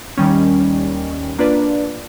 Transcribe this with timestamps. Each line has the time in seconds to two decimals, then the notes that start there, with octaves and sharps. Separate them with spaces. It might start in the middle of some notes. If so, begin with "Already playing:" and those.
0.18 D#2 D#3 G3 C#4
1.38 A#3 D4 F4 B4 D5